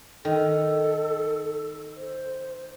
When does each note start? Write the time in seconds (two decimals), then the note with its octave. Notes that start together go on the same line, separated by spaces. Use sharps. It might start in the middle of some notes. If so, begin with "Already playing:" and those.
0.25 D#3 A4
1.96 C5